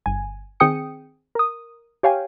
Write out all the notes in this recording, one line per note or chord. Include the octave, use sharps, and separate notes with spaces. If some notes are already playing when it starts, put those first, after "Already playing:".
G1 G#5
D#3 C4 G#4 G5 D#6 C#7
A#4 D#6
G4 C#5 F5 G5 G#5